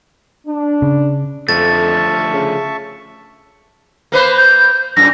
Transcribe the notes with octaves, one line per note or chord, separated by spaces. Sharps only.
D4
C#3
F2 D3 F3 A3 E5 A5 C#6 A6
C#3
A#3 B4 C5
G6
F#2 A#2 A#6